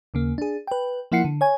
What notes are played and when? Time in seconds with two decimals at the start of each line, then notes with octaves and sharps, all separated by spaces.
0.14 D#2 C#3 A#3
0.38 D4 G#4
0.67 B4 G5
1.12 F3 A#3 E4 F#5 C7 C#7
1.24 D3
1.41 C#5 G#5